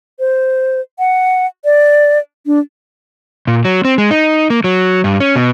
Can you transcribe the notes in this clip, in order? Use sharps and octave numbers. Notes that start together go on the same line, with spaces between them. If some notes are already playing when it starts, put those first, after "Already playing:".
C5
F#5
D5
D4
A#2
F#3
C4
G#3
D#4
A#3
F#3
G2
C#4
B2